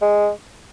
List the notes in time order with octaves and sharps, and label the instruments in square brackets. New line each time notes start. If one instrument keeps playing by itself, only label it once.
[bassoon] G#3